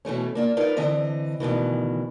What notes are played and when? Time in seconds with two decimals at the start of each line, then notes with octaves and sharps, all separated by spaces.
0.05 B2 E3 A3 C#4
0.35 A#3 D4 F4
0.57 D4 D#4 F4 A#4 B4 D5
0.77 D3 E3 C4 D#5
1.40 D2 B2 D#3 E3